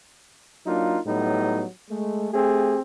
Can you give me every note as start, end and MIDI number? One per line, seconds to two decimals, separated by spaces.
0.66 0.98 54
0.66 0.98 58
0.66 0.98 62
0.66 0.98 63
0.66 0.98 65
1.07 1.65 45
1.07 1.65 54
1.07 1.65 55
1.07 1.65 59
1.07 1.65 63
1.90 2.28 56
1.90 2.28 57
2.33 2.79 57
2.33 2.79 60
2.33 2.79 67
2.33 2.79 68